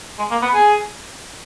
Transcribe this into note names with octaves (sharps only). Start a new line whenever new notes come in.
G#3
A#3
B3
G#4